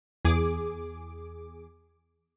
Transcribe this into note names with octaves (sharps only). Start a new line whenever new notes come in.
E2 G#4 D6